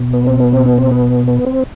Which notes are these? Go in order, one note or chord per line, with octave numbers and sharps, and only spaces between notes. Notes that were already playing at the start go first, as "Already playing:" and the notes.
Already playing: B2
B3
C4
B3
C4
B3
C4
B3
B3
C4